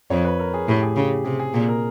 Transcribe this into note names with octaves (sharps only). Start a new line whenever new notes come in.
F2 C#5
B4
A#4
G#4
A2 G4
G#4
C#3 G4
C3 G#4
G#4
A#2 G#4
A#4